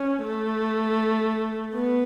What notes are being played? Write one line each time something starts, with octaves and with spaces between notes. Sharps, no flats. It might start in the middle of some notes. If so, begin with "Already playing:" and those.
Already playing: C#4
A3
B3